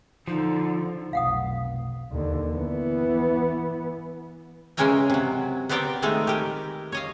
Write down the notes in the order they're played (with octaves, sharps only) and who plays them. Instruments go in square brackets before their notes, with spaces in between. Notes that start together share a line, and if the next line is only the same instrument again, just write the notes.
[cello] D3 [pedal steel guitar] F3 [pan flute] D#4
[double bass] F1 B1 [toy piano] F5 F#5 D#6
[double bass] D#2 D3
E3 B3
[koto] C#3 E3 G#3 C#4 A#4 G5
C3 F#3
B3 C4 G4 A#4 D5 G5
D#3 G#3 A3 D#4
G4 A#4
C#5 D#5 F5